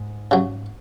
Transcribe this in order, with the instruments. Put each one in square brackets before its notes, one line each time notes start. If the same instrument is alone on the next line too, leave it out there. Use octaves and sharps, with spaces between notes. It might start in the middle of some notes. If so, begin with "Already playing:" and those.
Already playing: [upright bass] G#2
[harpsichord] C#3 F#3